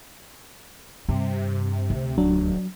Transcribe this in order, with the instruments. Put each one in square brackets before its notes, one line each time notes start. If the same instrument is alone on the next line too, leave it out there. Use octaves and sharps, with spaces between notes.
[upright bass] G2 [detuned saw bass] C3
[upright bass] D2
[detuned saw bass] D#1 [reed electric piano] F#3 [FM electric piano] D4